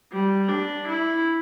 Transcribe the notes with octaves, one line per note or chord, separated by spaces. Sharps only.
G3
D4
E4